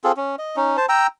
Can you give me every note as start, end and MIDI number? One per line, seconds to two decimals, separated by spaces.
0.04 0.12 60
0.04 0.12 65
0.04 0.12 68
0.04 0.12 69
0.17 0.36 61
0.39 0.56 75
0.56 0.77 61
0.56 0.77 63
0.77 0.86 72
0.77 0.86 81
0.89 1.07 79
0.89 1.07 82
0.89 1.07 88